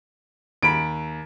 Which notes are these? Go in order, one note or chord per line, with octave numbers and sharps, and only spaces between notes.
D#2 B5 D7